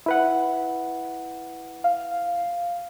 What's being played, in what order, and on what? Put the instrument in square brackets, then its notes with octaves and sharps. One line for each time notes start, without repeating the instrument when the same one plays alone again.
[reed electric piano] E4 B4 F#5
[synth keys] F5